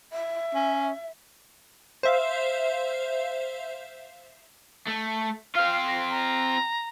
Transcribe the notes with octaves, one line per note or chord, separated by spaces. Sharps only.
E5
C#4
C5 E5 F5
A3
C4 F4 F5
A#6
A#5